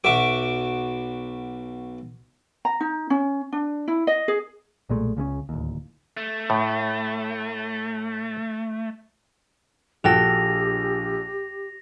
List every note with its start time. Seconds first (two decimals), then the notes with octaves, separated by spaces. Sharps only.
0.04 B1 F#4 E5 D6
2.65 A#5
2.80 D#4
3.10 C#4
3.52 D4
3.88 E4
4.07 D#5
4.28 G#4
4.89 B1 A#2 G#3 A3
5.17 C#2 C#3 G#3 C#4
5.49 D1 D#2
6.17 A3
6.50 A2
10.04 A#1 F#4 G4 A4 G5 A#6 F7